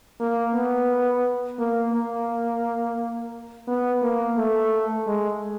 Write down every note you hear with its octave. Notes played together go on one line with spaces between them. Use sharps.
A#3
B3
A#3
A#3
B3
A#3
A3
G#3